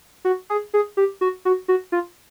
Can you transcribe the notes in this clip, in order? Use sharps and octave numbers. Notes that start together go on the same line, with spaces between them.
F#4
G#4
G#4
G4
F#4
F#4
F#4
F4